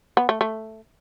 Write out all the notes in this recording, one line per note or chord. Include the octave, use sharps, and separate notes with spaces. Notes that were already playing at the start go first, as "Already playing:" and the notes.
B3
A3
A3